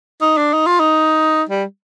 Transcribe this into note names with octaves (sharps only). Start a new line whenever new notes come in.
D#4
D4
D#4
F4
D#4
G3